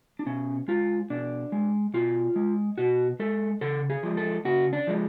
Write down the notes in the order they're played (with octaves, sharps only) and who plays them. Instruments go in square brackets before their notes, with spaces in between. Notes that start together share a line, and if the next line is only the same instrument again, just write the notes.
[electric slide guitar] D4
B2 C#4
G#3 F4
B2 D4
G#3
B2 F4
G#3
B2 F#4
G#3 A4
C#3 A4
G#4
F3 G#3
A4
C#3 F#4
D4
F3 G#3